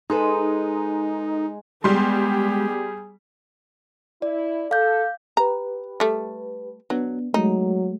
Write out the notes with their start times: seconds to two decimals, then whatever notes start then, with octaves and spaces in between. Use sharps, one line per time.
0.10 G#3 D#4 G#4 A4 B4
1.84 G3 G#3 B3 G4 G#4 C6
4.22 E4 D5
4.71 A4 F5 D6 G6
5.37 G4 B4 A#5
6.00 G3 A3
6.90 F#3 B3 D4
7.34 F#3 G#3 A3 D#4